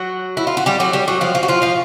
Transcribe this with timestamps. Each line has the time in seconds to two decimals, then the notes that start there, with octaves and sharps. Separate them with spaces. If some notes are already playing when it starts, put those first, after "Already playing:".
Already playing: F#3 F#4
0.37 E4
0.47 F4
0.57 F#4
0.66 G3 G4
0.80 F#3 F#4
0.93 G3 G4
1.08 F#3 F#4
1.21 F3 F4
1.35 F3 F4
1.43 F#4
1.48 F3 F4
1.62 F3 F4